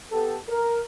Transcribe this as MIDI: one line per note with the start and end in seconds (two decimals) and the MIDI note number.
0.11 0.36 59
0.11 0.36 67
0.11 0.36 69
0.49 0.81 70